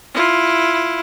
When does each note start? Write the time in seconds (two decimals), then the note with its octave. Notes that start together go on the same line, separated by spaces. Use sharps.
0.14 E4 F4